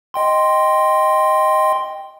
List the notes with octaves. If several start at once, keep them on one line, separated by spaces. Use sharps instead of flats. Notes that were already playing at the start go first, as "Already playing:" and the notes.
D#5 G5 C6